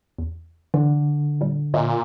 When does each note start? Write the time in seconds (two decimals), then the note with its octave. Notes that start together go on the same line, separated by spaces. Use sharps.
0.18 E2
0.74 D3 E3
1.41 A#2 G3
1.74 A#2 C#5 D#5 E5